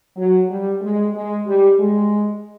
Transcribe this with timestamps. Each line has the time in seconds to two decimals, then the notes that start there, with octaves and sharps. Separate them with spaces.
0.16 F#3
0.48 G3
0.81 G#3
1.14 G#3
1.47 G3
1.79 G#3